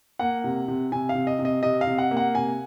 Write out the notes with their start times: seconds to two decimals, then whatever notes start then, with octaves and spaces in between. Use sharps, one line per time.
0.19 A#3 F#5
0.44 C3
0.68 C3
0.92 C3 G#5
1.09 F5
1.15 C3
1.27 D#5
1.39 C3
1.45 D#5
1.63 C3 D#5
1.81 F5
1.87 C3
1.98 F#5
2.11 A#3
2.17 F#5
2.35 C3 G#5